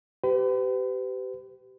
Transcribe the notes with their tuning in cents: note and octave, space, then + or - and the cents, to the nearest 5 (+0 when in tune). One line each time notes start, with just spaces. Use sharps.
G4 -20 B4 +40